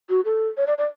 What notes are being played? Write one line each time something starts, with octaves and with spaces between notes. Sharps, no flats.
F#4
A4
C#5
D5
D5